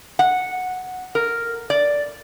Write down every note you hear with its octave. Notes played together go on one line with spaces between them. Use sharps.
F#5
A#4
D5